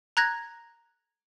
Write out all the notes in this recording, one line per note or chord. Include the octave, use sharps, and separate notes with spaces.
A#5 F#6 G#6 A#6